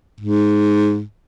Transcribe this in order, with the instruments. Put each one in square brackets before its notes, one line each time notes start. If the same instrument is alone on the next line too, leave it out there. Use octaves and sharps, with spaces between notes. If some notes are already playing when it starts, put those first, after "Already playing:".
[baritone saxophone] G#2